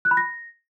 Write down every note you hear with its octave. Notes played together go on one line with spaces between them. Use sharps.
F#6
B5
A#6